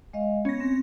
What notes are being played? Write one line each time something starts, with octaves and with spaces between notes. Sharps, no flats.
G#3 D#5 F5
B3 C#4 A#6
C4